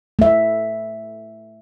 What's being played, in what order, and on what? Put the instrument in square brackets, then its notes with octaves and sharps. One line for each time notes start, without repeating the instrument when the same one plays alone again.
[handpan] A3 E5